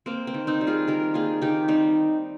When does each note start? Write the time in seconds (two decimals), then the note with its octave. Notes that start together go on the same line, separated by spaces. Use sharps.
0.06 A#3 C4
0.27 C4
0.34 D#3
0.47 C4 D#4
0.61 G3
0.67 F4 G#4
0.88 D#3 G4 A#4
1.14 A#3 F4 G#4
1.42 D#3 D#4 G4
1.68 G3 C4 D#4